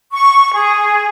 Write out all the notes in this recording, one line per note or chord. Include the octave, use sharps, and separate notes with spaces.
C#6
G#4